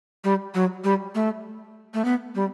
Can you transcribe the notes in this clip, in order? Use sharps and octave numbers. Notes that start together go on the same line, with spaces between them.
G3
F#3
G3
A3
A3
B3
G3